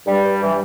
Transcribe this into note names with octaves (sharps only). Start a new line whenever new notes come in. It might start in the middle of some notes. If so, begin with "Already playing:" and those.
G2 G3
G2
E3
G3